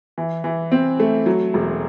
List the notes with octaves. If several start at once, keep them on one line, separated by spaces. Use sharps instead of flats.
E3
E3
C4
A3
F#3
E1